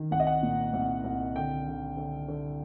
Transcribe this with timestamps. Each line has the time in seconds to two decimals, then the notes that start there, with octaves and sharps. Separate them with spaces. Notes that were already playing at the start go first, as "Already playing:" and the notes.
Already playing: D#3
0.11 C2 F#5
0.20 D#5
0.27 F#5
0.43 A#2
0.73 C2
1.04 C2
1.35 D3 G5
1.66 D3
1.97 D3
2.28 D3